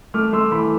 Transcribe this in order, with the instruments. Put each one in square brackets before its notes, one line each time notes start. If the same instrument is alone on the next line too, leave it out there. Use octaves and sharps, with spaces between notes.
[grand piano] A3 D6 F6
A3 C6 E6
E3 B5 D6